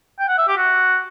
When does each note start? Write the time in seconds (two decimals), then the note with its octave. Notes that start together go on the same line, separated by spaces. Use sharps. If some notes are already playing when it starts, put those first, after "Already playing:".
0.19 G5
0.28 F#5
0.38 E5
0.48 G4
0.57 F#4